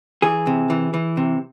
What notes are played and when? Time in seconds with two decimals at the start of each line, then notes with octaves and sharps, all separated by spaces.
0.22 E3 G#4
0.47 C3
0.70 E3
0.94 E3
1.17 C3